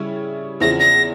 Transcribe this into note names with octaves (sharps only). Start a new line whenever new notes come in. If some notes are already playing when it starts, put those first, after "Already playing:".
Already playing: C#3 G3 C#4 E4
E2 C#3 F3 C4 E4 A#6
A#6